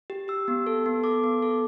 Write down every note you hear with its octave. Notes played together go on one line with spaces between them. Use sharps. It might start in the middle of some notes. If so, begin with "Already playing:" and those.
G4
G4 E6
B3
A4
B3
A4 D6
B3
A4